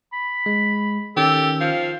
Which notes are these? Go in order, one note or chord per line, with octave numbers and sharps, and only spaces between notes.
B5
G#3
D#3 C#4 G4 A4
F3 F5